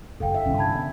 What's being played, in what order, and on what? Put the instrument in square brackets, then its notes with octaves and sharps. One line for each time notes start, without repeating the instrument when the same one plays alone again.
[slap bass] F#1 G2 [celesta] A4 F5 G5
[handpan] E5
[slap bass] B1 [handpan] D3 C#4
[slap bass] G2 C3 E3 [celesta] A5 B5 G#6
[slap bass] B3 [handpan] E5